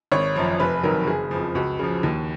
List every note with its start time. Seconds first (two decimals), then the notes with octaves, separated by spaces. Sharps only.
0.12 G#1 C#5
0.36 F#2 F3
0.59 F1 B4
0.83 F2 D#3 F#3 A#4
1.03 F#4
1.07 F#1 G#4
1.31 F2 F3
1.55 C#2 F#4
1.79 C#3 F3
2.03 D#2